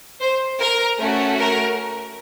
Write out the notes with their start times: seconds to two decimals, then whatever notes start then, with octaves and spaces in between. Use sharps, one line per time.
0.21 C5
0.60 A#4
0.99 A3 C#4 F#4
1.40 A#4